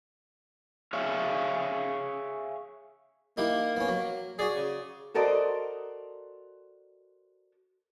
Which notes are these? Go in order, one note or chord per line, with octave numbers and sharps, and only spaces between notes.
G#4 C#5 E5 F5
A#3 D#4 E4 G4
B3 C#4
F#3
F#4 G#4 D5
C#3
F#4 A4 A#4 C5 D5 D#5